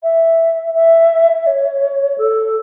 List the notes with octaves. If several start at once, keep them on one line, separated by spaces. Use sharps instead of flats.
E5
E5
C#5
A4